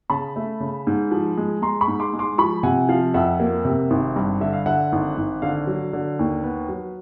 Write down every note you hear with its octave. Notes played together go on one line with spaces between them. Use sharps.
C#3 A5 B5
A3
C#3
G#2
F3
G#3
G#3 A#5 C6
B5 C#6
G#2
C6 D6
G#3
C6 D6
F3 B5 C#6
C3 F#5 G#5
F3 F5
F2 E5 F#5
A#3
C3
G#1
G2
D3 E5
F5
D3 E5 F#5
G#1
G#1
D3 F5
F#3
D3
D#2
B3
F#3